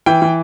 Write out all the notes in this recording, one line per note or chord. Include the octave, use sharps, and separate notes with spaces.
E3 G5
E3